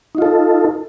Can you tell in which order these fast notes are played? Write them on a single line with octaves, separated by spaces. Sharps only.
D#4 F4 A4